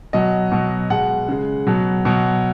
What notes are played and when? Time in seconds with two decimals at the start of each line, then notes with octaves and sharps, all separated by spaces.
0.13 B2 F#3 D#5
0.52 B2 F#3
0.90 B2 G#3 F#5
1.29 C#3 G#3
1.67 B2 F#3
2.05 B2 F#3